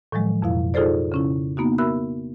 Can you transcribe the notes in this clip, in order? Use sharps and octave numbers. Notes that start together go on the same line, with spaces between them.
A2 D#3 F3 F#3 G#3
F2 B2 E4 F5
D#4 F4 G#4 A4 C5 D5
C#3 C#4 E4
A#3 B3 D#4 F#4
F#4 A#4 E5 B5 E6 F#6